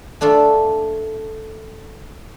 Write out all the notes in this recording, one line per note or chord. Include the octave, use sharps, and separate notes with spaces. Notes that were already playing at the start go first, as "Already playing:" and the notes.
A3 D4 F4 A4